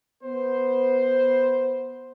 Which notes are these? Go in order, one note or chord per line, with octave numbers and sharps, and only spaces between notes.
B3 C5